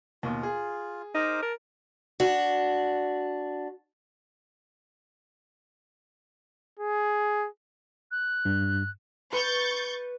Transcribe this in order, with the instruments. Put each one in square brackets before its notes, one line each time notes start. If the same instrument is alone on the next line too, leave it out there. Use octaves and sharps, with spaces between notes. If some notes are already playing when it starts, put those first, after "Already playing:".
[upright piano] D#2 B2 [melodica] F4
[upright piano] G#4
[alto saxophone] D#4 [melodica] A#4 C5 D6
[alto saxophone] A#4 [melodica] A5
[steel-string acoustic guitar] D4 F#4
[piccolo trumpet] G#4
[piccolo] F#6
[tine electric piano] G2
[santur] B4 [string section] C#6 G6 A6